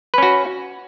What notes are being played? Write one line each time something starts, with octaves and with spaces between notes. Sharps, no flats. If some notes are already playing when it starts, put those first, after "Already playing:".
C#4 F#4 B4